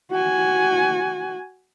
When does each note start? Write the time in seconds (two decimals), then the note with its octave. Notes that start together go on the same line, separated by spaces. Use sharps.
0.11 F#4 G#5